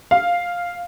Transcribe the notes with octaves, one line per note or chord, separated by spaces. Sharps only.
F5